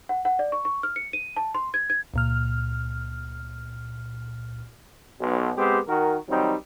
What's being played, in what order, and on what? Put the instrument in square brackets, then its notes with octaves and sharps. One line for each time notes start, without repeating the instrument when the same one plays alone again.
[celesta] F#5
F#5
D5
C#6
C#6
F6
C#7
D#7
A5
C6
G#6
G#6
[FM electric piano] C#2 A#2 F6
[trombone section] B1 B2
G#3 B3 C4 G4
D#3 F#4 A#4
D#3 F#3 G3 C4 D#4